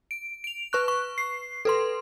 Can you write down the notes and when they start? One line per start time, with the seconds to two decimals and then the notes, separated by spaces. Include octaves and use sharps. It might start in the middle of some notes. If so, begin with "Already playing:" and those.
0.11 D7
0.44 D7 F7
0.73 B4 C#6 F#6
0.88 C#6
1.18 C7
1.65 A4 B4 C6